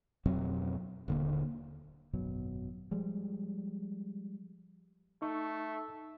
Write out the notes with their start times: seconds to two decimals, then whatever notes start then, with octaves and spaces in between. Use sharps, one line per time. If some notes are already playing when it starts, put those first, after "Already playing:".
0.26 F2 B2 F#3 C4
1.08 D#1 D3 A#3
2.13 G#1 F#2 B2 F#3
2.91 F3 G3 G#3
5.22 A3 D#4 C#6